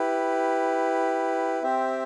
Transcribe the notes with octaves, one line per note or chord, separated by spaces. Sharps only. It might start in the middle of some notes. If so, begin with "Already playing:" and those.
Already playing: E4 G4 B4
C4 G4 C5 E5